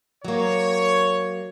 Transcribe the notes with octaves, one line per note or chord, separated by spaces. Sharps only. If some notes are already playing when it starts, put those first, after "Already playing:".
F#3 A#3 C#5